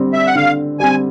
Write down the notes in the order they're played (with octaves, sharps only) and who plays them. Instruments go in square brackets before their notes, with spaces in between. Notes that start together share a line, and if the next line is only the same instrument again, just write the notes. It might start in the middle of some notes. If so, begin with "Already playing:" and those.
Already playing: [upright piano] D3 G3 C4
[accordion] E5
F#5
[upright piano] D3 [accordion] F5
[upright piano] G3 C4 [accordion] G#5